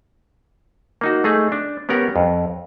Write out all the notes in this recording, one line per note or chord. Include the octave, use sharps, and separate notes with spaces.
A#3 D#4 F#4
A3 D#4 G#4
D4
B3 C#4 G4 A#4 F#5
F2